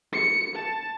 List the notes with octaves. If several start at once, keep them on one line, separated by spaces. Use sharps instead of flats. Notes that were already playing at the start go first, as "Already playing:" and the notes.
C#7
A5